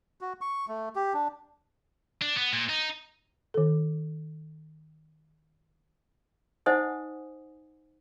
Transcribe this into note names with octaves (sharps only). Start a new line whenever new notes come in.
F#4
C#6
A3
G4
D4
D4
B3
A#2
D#4
D#3 A4
D#4 C5 D#5 F#5 G#5 D#6